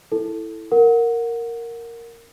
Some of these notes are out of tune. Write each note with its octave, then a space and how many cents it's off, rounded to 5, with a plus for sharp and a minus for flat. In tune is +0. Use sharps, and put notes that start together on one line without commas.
E4 +0 A4 +0
A#4 -5 F#5 -15